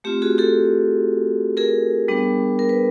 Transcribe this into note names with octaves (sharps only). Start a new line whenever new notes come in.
A3 C4 F4 G4
F#4 G#4
G4 A4
G#4 A#4
G3 B3 D4
A#4
B4